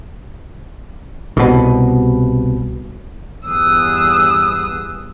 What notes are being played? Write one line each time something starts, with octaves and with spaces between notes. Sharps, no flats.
C2 B2
E2 G2 G#4 D#6 E6 F#6